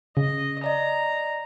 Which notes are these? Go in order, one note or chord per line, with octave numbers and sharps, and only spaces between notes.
C#3 D#5
D5 D#5 A#5